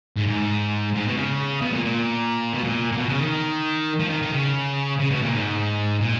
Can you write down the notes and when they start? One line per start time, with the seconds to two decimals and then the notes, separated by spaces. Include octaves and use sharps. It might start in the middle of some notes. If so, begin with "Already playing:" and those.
0.16 G#2
0.27 G#2
0.94 G#2
1.07 B2
1.17 C#3
1.62 B2
1.73 A#2
1.85 A#2
2.54 B2
2.64 A#2
2.92 A#2
2.97 B2
3.09 C#3
3.20 D#3
4.00 F3
4.10 D#3
4.22 D#3
4.32 C#3
5.00 C#3
5.11 B2
5.23 A#2
5.34 G#2
6.01 A#2